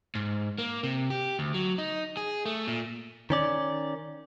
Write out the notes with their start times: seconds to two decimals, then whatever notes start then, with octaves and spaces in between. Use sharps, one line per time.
0.15 G#2
0.58 A#3
0.83 C3
1.10 G4
1.39 D2
1.54 F#3
1.78 D#4
2.17 G#4
2.46 A3
2.68 A#2
3.30 D#3 C#4 D5